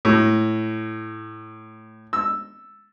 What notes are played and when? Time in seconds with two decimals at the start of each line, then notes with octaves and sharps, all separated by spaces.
0.05 A2
2.13 E6